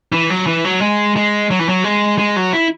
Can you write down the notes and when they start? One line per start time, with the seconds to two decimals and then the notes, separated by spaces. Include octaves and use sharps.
0.12 E3
0.30 F#3
0.47 E3
0.65 F#3
0.81 G#3
1.16 G#3
1.51 F#3
1.59 E3
1.69 F#3
1.84 G#3
2.18 G#3
2.36 F#3
2.53 E4